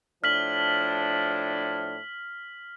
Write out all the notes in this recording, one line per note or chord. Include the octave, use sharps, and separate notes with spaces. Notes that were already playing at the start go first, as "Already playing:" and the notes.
A2 F3 D4 F6 B6 F#7